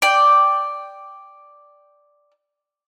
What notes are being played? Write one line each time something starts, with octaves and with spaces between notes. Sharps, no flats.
D5 G5